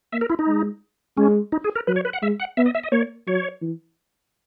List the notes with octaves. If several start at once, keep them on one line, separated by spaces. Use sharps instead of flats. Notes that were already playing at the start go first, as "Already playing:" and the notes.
A#3 E5
A#4
E4
D#4
G#3
G#3 C#4
D#4
G#4
A#4
F#3 B4
C#5
B4
F#5
G#3 E5
F#5
B3 E5
D#5
E5
D#5
A#3 C#5
F#3 C#5
E3